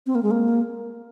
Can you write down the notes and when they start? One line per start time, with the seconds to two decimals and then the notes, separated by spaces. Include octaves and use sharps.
0.07 C4
0.15 A#3
0.23 G#3
0.31 A#3